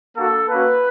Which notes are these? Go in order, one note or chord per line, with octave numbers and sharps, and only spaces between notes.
A#3 D4 F#4 A4
A#3 C#4 F#4 B4